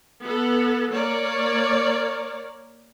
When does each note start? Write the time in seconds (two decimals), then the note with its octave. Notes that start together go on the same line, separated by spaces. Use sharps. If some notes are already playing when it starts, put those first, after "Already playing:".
0.22 B3 A4
0.92 A#3 A#4 C#5 D5